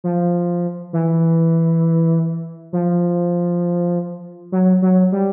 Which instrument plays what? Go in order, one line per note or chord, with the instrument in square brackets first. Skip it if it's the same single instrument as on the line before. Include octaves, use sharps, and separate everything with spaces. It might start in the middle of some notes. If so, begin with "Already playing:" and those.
[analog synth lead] F3
E3
F3
F#3
F#3
G3